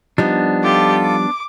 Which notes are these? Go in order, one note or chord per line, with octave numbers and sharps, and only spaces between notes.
F3 G3 B3 D4 D#4
F4 G4 A4
D6